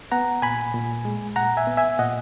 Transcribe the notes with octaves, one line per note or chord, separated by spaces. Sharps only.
B3 F#5 A#5
A#2 G#5 B5
A#2
G#3
A#2 F#5 A#5
E5 G#5
B3
E5 G#5
A#2 D#5 F#5